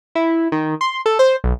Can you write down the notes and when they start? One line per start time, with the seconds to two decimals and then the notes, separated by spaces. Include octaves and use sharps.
0.15 E4
0.52 D#3
0.81 C6
1.06 A4
1.19 C5
1.44 B1